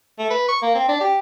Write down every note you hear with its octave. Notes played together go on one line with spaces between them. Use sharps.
A3
B4
C#6
A#3
C4
D4
G4